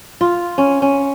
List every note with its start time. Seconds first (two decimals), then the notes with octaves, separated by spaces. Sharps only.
0.21 F4
0.58 C#4
0.82 C#4